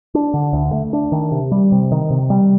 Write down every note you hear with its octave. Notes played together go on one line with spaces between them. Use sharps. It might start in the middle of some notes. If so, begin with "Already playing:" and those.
D4
D3
D2
A3
D4
D#3
C3
G3
C3
D#3
C3
G3